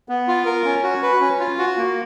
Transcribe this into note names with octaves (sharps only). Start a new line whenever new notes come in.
B3
F4
A#4
C#4
F#4
B4
C#4
F4
F#4
A#3